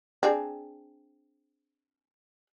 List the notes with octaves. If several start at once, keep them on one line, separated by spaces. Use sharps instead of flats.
C4 D4 G#4